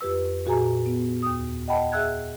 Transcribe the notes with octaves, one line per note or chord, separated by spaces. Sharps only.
F2 G4 B4 E6
A#2 F#4 G#4 G#5 A#5
B3
D#2 D#6
D#5 F#5 G5 A5 B5
G#4 E5 E6 F#6 G#6